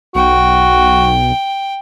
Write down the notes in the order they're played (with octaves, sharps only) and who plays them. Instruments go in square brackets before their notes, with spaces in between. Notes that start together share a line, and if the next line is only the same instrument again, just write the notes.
[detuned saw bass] B1 [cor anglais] F#4 [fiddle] G5